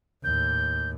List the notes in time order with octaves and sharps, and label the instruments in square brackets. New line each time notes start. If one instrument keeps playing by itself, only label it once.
[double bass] D#2 A2 [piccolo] G6